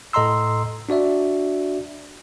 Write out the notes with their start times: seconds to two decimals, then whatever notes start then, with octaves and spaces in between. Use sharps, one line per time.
0.13 A2 A4 D#5 A#5 C6 E6
0.89 D4 F#4 D5 E5